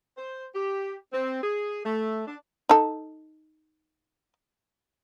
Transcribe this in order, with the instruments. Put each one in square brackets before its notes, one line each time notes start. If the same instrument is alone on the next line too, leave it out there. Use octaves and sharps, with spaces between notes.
[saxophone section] C5
G4
C4
G#4
A3
D4
[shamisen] D#4 A4